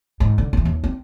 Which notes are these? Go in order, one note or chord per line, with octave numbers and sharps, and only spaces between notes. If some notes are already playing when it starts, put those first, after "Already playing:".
G#2
D3
D3 E3
D#2
C4